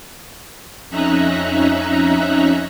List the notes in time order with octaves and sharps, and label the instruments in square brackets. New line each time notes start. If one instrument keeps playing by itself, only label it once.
[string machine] F2 C#4 D#4 E5 A#5 F#6